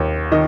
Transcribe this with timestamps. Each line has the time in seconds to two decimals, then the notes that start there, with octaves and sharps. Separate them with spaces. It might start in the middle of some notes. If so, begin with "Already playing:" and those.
Already playing: D#2
0.32 D#3 D#5